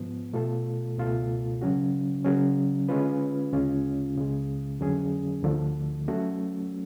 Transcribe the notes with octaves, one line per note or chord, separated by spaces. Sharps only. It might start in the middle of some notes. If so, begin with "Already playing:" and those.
Already playing: G#2 F3 B3
B2 A3 F4 A4
C#2 B2 A3 F4 A4
C#3 F#3 C#4 F#4
C#3 F#3 C#4
D3 G#3 C#4 F4 B4
D2 C#3 G#3 C#4 F4
C#2 C#3 G#3
F2 D3 F#3 C#4 G#4
D2 D3 F3 A3
F#3 A3 C#4 F#4